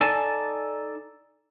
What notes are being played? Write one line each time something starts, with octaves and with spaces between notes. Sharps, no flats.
D#4 A4 D5 G#5 A5